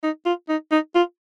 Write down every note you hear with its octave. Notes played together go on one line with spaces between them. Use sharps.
D#4
F4
D#4
D#4
F4